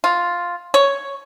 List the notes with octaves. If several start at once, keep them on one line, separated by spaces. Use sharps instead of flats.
F4
C#5